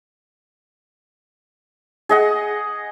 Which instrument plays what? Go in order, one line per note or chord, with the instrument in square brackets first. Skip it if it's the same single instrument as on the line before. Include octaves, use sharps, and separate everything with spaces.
[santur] G#4 D#5 F#5